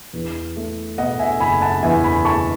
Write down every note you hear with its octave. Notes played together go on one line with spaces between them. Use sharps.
E2
A3
B2 D#5 F#5
E5 G#5
F#1 G#5 B5
F#5 A5
E2 E5 G#5
G#5 B5
A3 A5 C#6